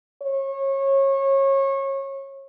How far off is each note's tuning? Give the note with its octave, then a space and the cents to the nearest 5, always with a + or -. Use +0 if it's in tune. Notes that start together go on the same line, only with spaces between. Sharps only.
C#5 -25